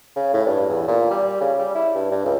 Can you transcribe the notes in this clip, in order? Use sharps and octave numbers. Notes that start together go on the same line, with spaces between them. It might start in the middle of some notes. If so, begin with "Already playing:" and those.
C#3
A2
G2
E2
A#2
G3
C#3
G3
E4
G2
G2
C#2